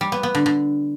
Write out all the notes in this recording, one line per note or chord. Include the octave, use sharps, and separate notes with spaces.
G3
B3
B3
D3
D3